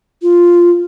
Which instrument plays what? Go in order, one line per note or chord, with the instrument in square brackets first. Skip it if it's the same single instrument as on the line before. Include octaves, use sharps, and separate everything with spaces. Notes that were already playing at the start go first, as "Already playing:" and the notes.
[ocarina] F4